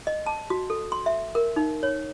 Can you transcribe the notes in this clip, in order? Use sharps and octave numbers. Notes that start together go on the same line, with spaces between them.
D#5
A5
F#4
A4
C6
E5
A#4
D#4
C#5